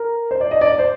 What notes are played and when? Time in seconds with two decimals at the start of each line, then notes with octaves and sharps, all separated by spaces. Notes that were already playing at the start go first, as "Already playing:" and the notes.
Already playing: A#4
0.31 C5
0.41 D5
0.51 D#5
0.61 D5
0.72 D5
0.79 C5